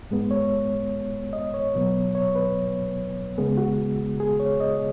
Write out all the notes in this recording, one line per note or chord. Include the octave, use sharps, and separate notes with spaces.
G#2 G#3 B3
C#5
D#5
C#5
B2 F#3 B3
C#5
B4
C#3 G#3 B3 G#4
F#4
G#4
C#5
D#5